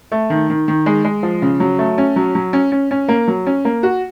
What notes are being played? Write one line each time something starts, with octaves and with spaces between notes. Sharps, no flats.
A3
D#3
D#3
D#3
G#3
G#3
F3
C#3
F#3
A3
C#4
F#3
F#3
C#4
C#4
C#4
A#3
F#3
C#4
A#3
F#4